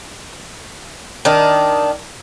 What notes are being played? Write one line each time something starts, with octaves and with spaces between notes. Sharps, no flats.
D#3 D4